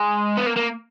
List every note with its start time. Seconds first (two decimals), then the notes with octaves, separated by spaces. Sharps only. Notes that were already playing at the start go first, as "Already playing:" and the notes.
Already playing: G#3
0.37 B3
0.46 A#3
0.56 A#3